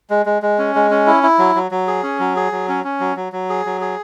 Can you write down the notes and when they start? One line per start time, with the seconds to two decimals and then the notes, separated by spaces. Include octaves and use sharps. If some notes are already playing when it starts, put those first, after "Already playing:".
0.10 G#3
0.26 G#3
0.42 G#3
0.58 C#4
0.75 G#3
0.91 C#4
1.07 E4
1.23 E4
1.39 F#3
1.55 F#3
1.71 F#3
1.88 G#4
2.03 C#4
2.19 F#3
2.36 G#4
2.52 F#3
2.68 C#4
2.84 C#4
3.00 F#3
3.16 F#3
3.32 F#3
3.49 G#4
3.65 F#3
3.81 G#4